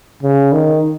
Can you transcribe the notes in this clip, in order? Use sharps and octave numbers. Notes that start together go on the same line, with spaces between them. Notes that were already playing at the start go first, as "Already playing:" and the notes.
C#3
D#3